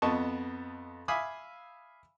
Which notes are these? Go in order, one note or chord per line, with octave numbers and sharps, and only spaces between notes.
F2 B3 D#5 A5 C#6
E5 F5 G#5 B5 D6 D#6